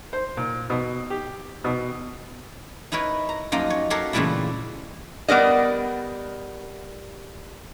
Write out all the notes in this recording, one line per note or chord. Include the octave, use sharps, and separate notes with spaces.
C5
A#2
B2
G4
B2
D#4 E4 A#4 B4 C#5
A#5
F#2 F3 A#3 D#4 F4 D#5
C#5
F#4 G4 A4 A#4 C#5 F5
A#2 C#3 E3 G3 A3 E4
G3 B3 A#4 D5 D#5